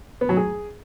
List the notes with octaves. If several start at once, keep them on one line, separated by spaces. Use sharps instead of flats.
B3
F#3
G#4